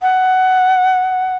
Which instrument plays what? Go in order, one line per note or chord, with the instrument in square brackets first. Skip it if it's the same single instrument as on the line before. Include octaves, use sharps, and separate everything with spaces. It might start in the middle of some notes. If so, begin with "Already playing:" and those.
[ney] F#5